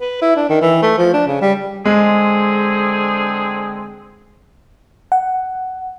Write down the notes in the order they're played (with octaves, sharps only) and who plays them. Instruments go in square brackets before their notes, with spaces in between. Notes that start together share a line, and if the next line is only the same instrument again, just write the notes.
[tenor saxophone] B4
E4
D4
D#3
E3
A3
F3
D4
C#3
G3
[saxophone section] D3 C4 G#4 [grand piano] G#3
[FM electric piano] F#5